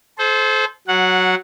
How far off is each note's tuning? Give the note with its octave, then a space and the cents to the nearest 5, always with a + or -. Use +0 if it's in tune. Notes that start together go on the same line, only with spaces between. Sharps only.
A4 -35 C5 +0
F#3 +0 F#5 -15